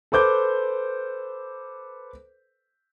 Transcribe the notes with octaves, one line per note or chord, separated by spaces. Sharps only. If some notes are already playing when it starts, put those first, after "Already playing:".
A4 B4 C5 D6 G6